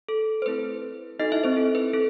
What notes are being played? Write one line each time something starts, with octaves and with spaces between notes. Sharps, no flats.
A4
C5
A3 C4 E4 A4 B4
B3 D#4 F#4 A4 D#5
E4 E5
C4 C5
A4
B4
C4 A4